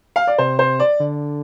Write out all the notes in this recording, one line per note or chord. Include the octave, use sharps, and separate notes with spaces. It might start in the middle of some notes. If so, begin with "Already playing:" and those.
F5
D5
C3 C5
C5
D5
D3